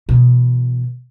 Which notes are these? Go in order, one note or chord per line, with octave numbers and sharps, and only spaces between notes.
B2 E3